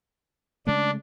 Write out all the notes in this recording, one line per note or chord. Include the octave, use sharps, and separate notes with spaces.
C#3 G#3 A3 D4